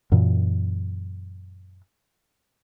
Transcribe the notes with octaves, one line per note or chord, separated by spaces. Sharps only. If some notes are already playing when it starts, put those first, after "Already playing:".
F#2 A#2 E3